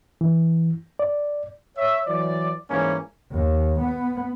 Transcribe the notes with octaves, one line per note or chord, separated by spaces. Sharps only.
E3
D5
C#5 E5
E3 F#3 D5
G#2 E3 G3 A#3 C#4
D#2
B3